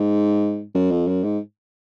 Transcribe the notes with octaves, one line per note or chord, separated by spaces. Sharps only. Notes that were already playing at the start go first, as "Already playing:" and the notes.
Already playing: G#2
F#2
F2
F#2
G#2